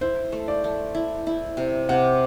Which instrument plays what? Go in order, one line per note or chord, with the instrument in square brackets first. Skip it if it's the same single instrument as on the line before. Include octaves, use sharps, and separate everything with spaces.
[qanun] E4 [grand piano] C5
[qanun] A3
[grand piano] D5
[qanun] A3
E4
E4
C3
[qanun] C3 [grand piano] F#5